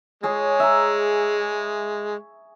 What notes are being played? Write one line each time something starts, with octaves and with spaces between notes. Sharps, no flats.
G#3 G#4 C#5
E5 A#5